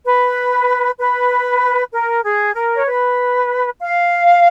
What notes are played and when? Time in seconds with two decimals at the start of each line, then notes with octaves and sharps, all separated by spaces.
0.06 B4
0.99 B4
1.92 A#4
2.23 G#4
2.54 A#4
2.75 C#5
2.86 B4
3.79 F5